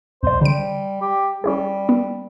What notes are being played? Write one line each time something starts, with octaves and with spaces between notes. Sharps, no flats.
C2 C5 D5
D3 G3 D7
G4
G3 C#4 E4 G#4
B3